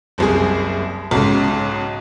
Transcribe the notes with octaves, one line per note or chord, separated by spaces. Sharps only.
F#1 C2 G#4
B1 G#2 C#3